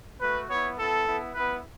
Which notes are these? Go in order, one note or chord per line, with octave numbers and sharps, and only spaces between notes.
A3 F#4 B4
B3 E4 C#5
B3 E4 A4
B3 E4
B3 E4 B4